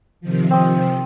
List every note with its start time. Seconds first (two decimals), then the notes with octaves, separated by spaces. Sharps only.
0.21 C3 D#3 F3
0.51 C4 D#5